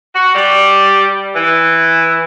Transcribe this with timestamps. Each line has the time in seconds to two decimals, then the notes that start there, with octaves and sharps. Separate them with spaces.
0.14 F#4
0.35 G3
1.35 E3